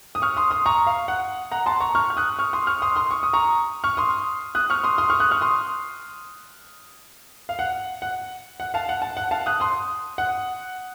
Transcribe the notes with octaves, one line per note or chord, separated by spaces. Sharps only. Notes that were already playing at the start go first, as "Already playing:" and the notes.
D#6
C#6 F6
C6 D#6
C6 D#6
A#5 C#6
F5
F#5
F#5 A#5
A5 C6
A#5 C#6
C#6 F6
F6
D#6 F#6
C#6 F6
C6 D#6
C#6 F6
C6 D#6
C6 D#6
C#6
D#6
A#5 C#6
C#6 F6
C6 D#6
D#6 F#6
C#6 F6
C6 D#6
C6 D#6
C#6 F6
D#6 F#6
C#6 F6
C6 D#6
F5
F#5
F#5
F#5
F5 A5
F#5
A5
F#5
F5 A5
D#6 F#6
C6 D#6
F#5